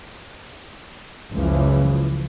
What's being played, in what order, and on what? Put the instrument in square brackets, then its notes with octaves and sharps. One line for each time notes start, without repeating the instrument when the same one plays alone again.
[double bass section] F#1 C#2 C#3 E3 F3